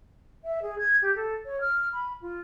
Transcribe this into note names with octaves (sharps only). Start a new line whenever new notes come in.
E5
G#4
G#6
G4
A4
C#5
F6
B5
F4